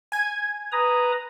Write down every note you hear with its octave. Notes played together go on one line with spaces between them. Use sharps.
G#5 G#6
B4 A#5 D#6